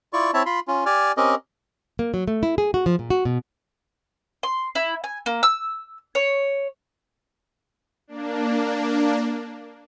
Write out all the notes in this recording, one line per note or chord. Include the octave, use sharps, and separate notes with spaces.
E4 F4 D5 C#6
C4 E4 C#5 E5 A5
F4 B5 C6
C#4 F4
G4 D5 G#5 F6
C4 C#4 G4 A#4 D#5
A#3
F#3
A3
E4
G#4
F#4
F3
A#2
F#4
B2
C6
E4
G#5
A#3
E6
C#5
A#3 D4